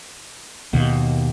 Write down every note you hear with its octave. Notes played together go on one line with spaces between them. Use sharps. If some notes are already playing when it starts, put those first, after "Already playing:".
D#2 B2